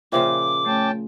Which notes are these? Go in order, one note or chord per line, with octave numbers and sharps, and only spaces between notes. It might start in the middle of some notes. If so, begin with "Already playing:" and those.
A#2 C#3 F3 C5 E5 G5 D6
A3 C#4 G5 A5